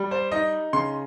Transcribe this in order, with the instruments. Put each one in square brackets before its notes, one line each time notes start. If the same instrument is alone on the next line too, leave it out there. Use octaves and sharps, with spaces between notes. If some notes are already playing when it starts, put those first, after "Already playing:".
Already playing: [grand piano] G3
C5
D#4 D#5
C#3 C6